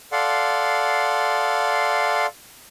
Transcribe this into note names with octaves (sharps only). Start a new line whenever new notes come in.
A4 D5 F5 F#5 C6